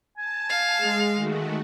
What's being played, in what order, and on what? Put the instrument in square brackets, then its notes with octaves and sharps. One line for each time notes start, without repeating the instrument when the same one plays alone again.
[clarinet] G#5 [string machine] A5
[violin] F5
[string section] G#3
[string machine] D#3 A3 F#4